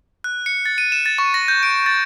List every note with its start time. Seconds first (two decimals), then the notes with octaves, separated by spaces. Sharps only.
0.24 F#6
0.46 C#7
0.66 A6
0.78 D#7
0.92 E7
1.06 A6
1.18 C#6
1.34 A#6
1.48 G6
1.63 D7
1.86 A6